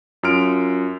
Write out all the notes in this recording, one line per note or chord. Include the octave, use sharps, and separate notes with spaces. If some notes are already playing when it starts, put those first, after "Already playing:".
F#2 F4 F6 D7